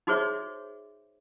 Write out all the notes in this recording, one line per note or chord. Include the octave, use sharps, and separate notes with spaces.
D#4 F#4 G#4 C5 C#5 E5